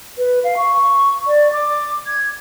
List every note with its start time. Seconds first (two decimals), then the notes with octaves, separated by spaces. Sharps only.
0.18 B4
0.44 F5
0.57 C#6
1.27 D5
1.53 D6
2.07 G#6